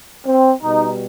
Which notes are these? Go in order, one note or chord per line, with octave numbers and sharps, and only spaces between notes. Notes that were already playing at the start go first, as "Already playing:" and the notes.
C4
B2 G3 D#4